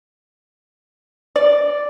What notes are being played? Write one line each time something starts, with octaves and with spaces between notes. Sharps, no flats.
D5